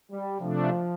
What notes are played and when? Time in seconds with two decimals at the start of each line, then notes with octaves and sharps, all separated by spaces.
0.11 G3
0.40 C3 F3 A3 D4